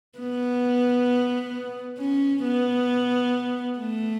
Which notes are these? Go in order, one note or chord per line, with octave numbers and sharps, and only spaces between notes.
B3
C#4
B3
A3